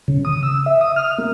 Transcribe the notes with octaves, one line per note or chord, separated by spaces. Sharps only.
C#3
D#6
E6
E5
D#6
F6
A#3